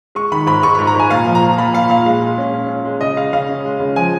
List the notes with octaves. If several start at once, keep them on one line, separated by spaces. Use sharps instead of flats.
G#3 C#6
D#3 B5
G#2 B5
G#2 C#6
G#2 B5
A#5
G#2 G#5
A#2 F5
F3
A#5
F3
A#2 B5
A#2 F5
A#2 F5
G#3 F5
G#3
C#4
C#4
C#4
G#3
C#3 D#5
C#3 F5
C#3 F5
C#4
G#3
C#3
F3 G#5